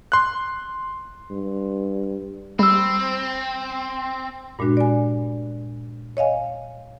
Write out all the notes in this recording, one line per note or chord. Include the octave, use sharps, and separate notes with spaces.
C6 F#6
G2
G3 C4 B5 E6
G2 A#2 G#3 D4 F#4
D5 G#5
C#5 D#5 F5 G#5